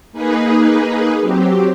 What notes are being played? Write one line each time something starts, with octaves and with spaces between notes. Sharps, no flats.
A#3 D#4 G#4 B4
F#3 C4 G4